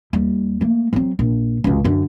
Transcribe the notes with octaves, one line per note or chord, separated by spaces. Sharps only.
D#2 G3
A3 A#3
F#3 C4
A#1
C#2 F#2
F#2 D3